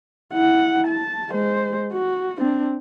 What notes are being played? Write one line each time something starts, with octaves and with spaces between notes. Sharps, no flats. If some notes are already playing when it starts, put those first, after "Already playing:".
E4 F#5
A5
G#3 C5
F#4
C4 D4